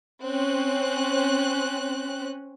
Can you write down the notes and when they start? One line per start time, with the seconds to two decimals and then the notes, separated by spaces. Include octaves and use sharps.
0.25 C4 C#4 F#6